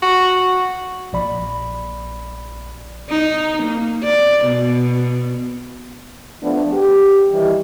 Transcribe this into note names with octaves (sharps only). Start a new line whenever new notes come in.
F#4
A#1 D5 B5
D#4
A#3
D5
B2
F3 A3 B3 D4
G4
D#3 E3 G3 D#4